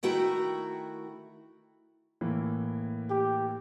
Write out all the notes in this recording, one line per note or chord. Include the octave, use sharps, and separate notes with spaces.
D#3 A3 E4 F#4 G5 A#5
A2 E3 A#3
G4